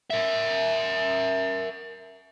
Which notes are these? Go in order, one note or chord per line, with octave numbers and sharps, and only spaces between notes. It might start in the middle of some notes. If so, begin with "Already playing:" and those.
A#4 E5